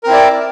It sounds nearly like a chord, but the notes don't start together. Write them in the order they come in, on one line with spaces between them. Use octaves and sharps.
A#4 C4 E4 D5